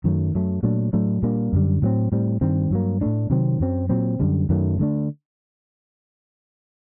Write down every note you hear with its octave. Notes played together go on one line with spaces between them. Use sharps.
F#2 D#3 F#3 A3
F#2 F#3 A3
A#2 F#3 A3 D4
A2 F#3 A3 D4
A#2 G3 A#3 D4
F#2 D3 G3
A2 F#3 A3 C4
A2 G3 C4
G2 D#3 G3 C4
G2 F#3 A#3
A2 A3 D4
C3 D#3 F#3 C4
F#2 F#3 C4
A#2 F#3 C4
F#2 D3 G3
F#2 D#3 F#3 A3
D3 A3 D4